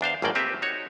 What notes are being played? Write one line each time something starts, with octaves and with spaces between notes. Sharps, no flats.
E2 D4 C5 F5
G#1 F#2 A2 A#3 D5 G5
A#3 C4 G4 B4 E5
D#4 F#4 C#5